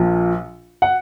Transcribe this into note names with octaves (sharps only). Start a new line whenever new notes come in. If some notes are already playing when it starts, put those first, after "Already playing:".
Already playing: A#1 A#2 F3
F#5